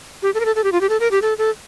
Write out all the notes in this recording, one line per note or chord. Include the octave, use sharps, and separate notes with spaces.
G4
A4
A#4
A4
A4
G4
F4
G4
A4
A#4
G4
A4
A4